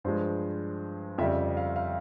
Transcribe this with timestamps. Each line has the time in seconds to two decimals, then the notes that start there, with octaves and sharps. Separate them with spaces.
0.04 G2 F3 G#3 C5
1.18 F2 C#3 G3 E5
1.57 F5
1.76 F5